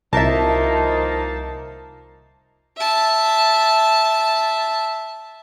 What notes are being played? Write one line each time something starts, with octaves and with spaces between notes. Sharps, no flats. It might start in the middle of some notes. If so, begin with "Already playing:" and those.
C2 F3 A#3 D#4 A#4 E5 A5
E5 A5